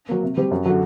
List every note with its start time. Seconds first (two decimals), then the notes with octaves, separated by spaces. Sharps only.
0.09 F#3 A#3
0.23 C3
0.37 G3 C4 G4
0.51 F#2
0.66 D3 F#3